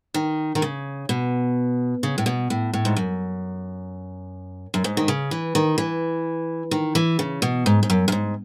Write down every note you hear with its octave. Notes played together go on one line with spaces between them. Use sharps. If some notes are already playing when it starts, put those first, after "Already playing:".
D#3
D#3
C#3
B2
C#3
A2
B2
A2
A2
G#2
F#2
F#2
G#2
D#3
C#3
E3
D#3
E3
D#3
E3
C#3
B2
G#2
G#2
F#2
F#2
G#2